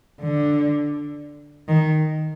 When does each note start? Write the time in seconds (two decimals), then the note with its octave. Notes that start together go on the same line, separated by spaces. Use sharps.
0.21 D3
1.68 D#3